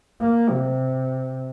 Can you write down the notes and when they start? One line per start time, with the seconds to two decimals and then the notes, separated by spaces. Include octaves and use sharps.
0.21 A#3
0.50 C3